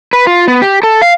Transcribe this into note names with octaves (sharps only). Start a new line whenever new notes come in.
B4
F4
B3
G4
A4
F5